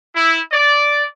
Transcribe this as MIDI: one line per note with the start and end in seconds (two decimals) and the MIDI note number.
0.15 0.40 64
0.52 1.06 74